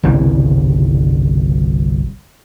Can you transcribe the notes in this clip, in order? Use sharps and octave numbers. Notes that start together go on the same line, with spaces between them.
G1 C2 C#3 E3